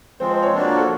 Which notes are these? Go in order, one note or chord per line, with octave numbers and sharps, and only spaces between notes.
F3 G#3 C4 C5
C5
C#5
F3 A#3 D4 F#4 C5
A#4
A4